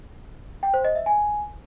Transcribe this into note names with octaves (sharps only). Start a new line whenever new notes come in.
G5
C5
D#5
E5
G#5